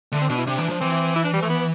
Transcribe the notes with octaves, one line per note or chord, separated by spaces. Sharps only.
D3 A3
C4
B2 D4
E4
C3 D4
E3
F3
E3 C4
E4
D4
G3
A3
B3